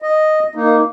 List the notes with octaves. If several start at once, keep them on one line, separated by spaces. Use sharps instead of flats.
D#5
A#3 D#4